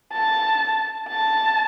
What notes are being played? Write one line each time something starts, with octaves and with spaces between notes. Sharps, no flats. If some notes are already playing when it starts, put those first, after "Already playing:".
A5
A5